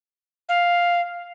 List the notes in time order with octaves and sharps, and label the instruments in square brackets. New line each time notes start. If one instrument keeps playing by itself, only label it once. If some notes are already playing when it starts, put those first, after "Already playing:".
[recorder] F5